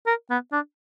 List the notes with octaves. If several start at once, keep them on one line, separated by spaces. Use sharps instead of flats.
A#4
B3
D4